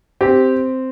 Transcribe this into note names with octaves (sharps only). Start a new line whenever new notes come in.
C4 G4